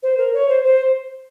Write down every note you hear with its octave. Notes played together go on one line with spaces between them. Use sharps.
C5
A#4
C#5
C5
C5